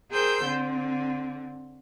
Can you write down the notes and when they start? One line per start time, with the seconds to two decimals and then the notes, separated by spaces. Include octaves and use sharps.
0.11 G#4 A#4 C5 G5 E6 G6
0.45 D3 C4